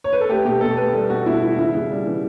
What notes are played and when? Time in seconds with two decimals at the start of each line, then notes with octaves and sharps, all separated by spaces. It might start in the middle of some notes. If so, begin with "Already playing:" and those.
0.04 C#5
0.13 B4
0.21 A4
0.29 A3 G4
0.45 B2 G4
0.61 B2 A4
0.77 A3 B4
0.93 G3 A4
1.10 B2 F#4
1.26 B2 E4
1.42 G3 E4
1.58 C#3 E4
1.75 C#3
1.90 G3
2.06 E3